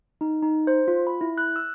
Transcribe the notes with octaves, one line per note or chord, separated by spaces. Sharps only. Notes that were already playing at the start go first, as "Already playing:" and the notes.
D#4
D#4
C5
F4
B5
E4
F#6
E6